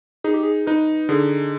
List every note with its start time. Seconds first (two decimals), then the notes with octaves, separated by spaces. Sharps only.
0.24 D#4 G#4
0.34 G4
0.43 G#4
0.67 D#4 B4
1.09 D3 G#4